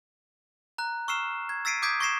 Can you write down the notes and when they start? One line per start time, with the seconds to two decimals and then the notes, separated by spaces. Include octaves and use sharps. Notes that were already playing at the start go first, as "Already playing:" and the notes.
0.78 A#5 F#6
1.08 C#6 E6 F6 C7 E7
1.49 G#6
1.65 E6 A6 B6 C7 D7 D#7
1.82 D6 D#6 G6 G#6 B6 D7
2.00 C#6 G#6 A#6 C7 E7